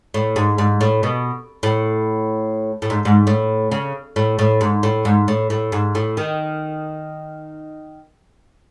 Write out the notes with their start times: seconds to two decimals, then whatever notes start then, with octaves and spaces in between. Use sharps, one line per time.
0.14 A2
0.36 G#2
0.58 G#2
0.81 A2
1.03 B2
1.63 A2
2.82 A2
2.90 G#2
3.05 G#2
3.27 A2
3.71 C#3
4.16 A2
4.39 A2
4.61 G#2
4.83 A2
5.05 G#2
5.28 A2
5.50 A2
5.72 G#2
5.95 A2
6.17 D#3